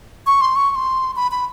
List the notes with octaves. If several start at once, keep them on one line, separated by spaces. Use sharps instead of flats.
C#6
C6
C#6
C#6
C6
B5
B5